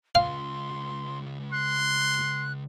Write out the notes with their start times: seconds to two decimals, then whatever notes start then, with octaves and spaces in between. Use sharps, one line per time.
0.15 C#2 F4 F5 C6
1.52 C6 F#6